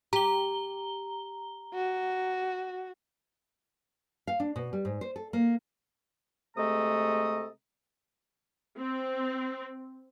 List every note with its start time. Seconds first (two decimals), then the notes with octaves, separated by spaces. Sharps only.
0.13 G4 A#5 G7
1.74 F#4
4.27 F5
4.40 D4
4.56 B2
4.73 G3
4.85 G#2
5.01 C5
5.16 A4
5.33 A#3
6.57 C3 G#3 A3 A4 A#5 D#6
8.78 C4